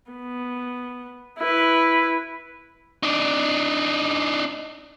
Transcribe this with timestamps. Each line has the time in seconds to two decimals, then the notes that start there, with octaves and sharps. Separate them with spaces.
0.11 B3
1.39 E4 B4
3.03 D4 D#4